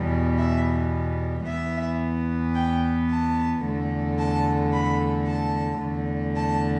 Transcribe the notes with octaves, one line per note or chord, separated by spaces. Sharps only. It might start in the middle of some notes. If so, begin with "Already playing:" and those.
Already playing: E2 B2 G3
E5
E2 E3 B3 E5
G5
A5
E2 D3 A3
A5
B5
A5
E2 D3 A3
A5